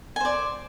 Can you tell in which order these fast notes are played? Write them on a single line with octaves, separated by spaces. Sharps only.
G#5 C5 D5